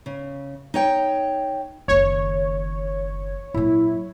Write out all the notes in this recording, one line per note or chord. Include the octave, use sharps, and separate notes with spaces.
C#3
D#4 C#5 G5
F#1 D#3 C#5
A#2 F#3 E4